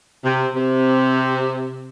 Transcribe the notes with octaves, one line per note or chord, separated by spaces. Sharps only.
C3
C3